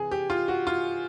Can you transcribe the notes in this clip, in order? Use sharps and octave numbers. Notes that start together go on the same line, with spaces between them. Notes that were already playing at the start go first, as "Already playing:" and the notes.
Already playing: C3 E3 G#4
G4
F4
F#4
F4